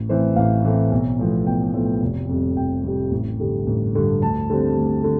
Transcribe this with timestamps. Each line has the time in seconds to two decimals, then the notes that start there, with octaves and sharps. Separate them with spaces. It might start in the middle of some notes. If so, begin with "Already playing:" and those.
Already playing: A1
0.09 A2 E3 A3 C4 C5
0.36 A1 F5
0.64 A2 E3 A3 C4
0.92 B1
1.19 A2 F3 B3
1.46 B1 G5
1.74 A2 F3 B3
2.02 F1
2.29 F2 C3 G3
2.57 F1 G5
2.84 F2 C3 G3
3.11 A1
3.39 G2 D3 G3
3.67 A1
3.95 G2 D3 G3
4.21 D2 A5
4.50 D3 G3 C4
4.77 D2
5.04 D3